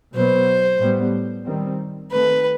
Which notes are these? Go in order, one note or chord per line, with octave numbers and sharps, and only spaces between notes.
B2 F#3 B3 C5
A2 G3 B3
D#3 G3 C4
D#3 A3 C4 B4